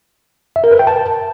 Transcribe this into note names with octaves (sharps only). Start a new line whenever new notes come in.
E5
A#4
B4
G5
A5